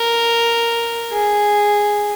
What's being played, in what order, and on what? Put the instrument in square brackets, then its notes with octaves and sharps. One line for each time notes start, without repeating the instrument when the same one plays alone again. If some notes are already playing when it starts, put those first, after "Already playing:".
Already playing: [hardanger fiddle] A#4
G#4